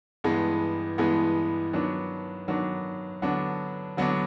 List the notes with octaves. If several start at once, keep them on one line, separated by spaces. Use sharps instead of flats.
G2 E3 G#3 B3
G2 E3 G#3 B3
D#3 F#3 B3 D4
D#3 F#3 B3 D4
D3 F#3 B3 D4
D3 F#3 B3 D4